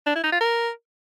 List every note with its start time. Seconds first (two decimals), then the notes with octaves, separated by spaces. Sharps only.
0.07 D4
0.15 E4
0.24 D#4
0.32 F4
0.41 A#4